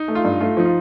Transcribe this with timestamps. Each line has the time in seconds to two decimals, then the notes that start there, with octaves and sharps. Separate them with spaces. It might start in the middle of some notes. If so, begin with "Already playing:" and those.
Already playing: D#4
0.08 A3
0.15 F4
0.25 G2
0.40 A3 F4
0.57 F3 D#4
0.65 F4